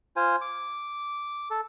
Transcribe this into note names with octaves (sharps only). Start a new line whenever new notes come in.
F4 C5 G#5
D6
A4